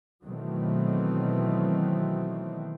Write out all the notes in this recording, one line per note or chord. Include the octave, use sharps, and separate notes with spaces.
B2 D#3 E3 F#3 A3 C4